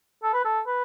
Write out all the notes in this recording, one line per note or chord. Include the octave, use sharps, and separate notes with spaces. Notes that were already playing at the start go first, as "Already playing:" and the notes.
A4
B4
A4
B4